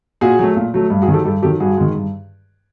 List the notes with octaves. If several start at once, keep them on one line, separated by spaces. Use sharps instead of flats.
A#2 F#4 G#4
F#3 A3
A#2
F#3 A3
G2
F#4 G#4
D#3 F#3
G4 A4
G2 G4 A4
D#3 F#3 G4 A4
G2 F#4 G#4
D#3 G#3
G2